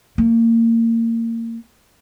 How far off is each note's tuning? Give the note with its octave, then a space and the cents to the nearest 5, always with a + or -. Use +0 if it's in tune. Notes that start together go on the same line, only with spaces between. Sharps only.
A#3 -30